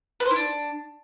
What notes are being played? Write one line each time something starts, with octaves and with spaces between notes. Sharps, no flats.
B4
C5
E4
D4